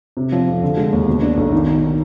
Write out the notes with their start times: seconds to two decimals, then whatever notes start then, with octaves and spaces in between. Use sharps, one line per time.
0.17 C3
0.32 F3
0.47 F2
0.62 D3
0.77 G#3
0.93 D#2
1.07 B2
1.22 D4
1.37 B1
1.52 D#3
1.67 D#3